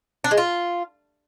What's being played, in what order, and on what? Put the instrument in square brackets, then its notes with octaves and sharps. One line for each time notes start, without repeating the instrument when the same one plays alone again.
[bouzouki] D4
G#3
F4